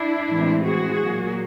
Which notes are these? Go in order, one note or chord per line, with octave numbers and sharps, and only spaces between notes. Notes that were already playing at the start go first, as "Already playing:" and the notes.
Already playing: D4 E4
A2 E3 G#3 C4
F#4 G#4
A#2 F#3 A#3